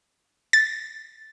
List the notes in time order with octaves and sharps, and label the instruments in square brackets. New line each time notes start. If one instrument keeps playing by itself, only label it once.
[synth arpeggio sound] A6